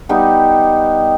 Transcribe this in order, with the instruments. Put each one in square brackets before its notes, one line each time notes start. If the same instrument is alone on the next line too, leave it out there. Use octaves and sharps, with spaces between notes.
[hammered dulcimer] G3 B3 D#4 G4